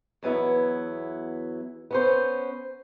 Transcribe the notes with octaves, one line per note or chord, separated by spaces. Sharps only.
E2 F#3 B3 E4
B3 C#4 C5